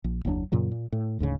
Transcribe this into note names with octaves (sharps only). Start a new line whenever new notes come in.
A#1
F#1 D#2 F#3 D4
F#2 A#2 C#3 F#3
A#2
A2
D1 D2 G#2 C#3